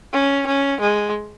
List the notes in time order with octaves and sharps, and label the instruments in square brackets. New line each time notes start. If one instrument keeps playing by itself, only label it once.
[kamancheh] C#4
C#4
G#3